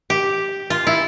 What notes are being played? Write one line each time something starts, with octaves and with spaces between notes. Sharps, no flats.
G4
F4
E4